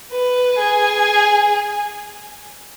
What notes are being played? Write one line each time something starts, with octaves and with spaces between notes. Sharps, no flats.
B4
G#4